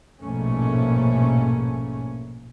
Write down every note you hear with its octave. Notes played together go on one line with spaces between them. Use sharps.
A#1 G#2 B2 A3 A#3 C#4